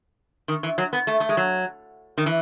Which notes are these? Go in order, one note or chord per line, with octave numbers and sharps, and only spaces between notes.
D#3
E3
F#3
B3
A3
A3
G#3
F#3
D#3
E3